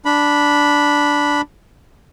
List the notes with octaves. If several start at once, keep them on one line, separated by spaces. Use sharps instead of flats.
D4 B5